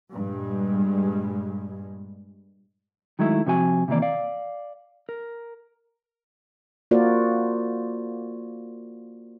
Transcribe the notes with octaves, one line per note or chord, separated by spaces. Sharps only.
G2 A#2 G3 G#3
D#3 F#3 G#3 A3 E4
C3 F3 F#4 G#5
C3 D#3 E3 A#3 D5
D5 F5
A#4
A#3 F4 F#4 A#4 C5 D5